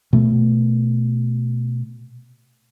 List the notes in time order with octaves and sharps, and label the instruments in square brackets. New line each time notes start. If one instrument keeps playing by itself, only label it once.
[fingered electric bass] B2 A3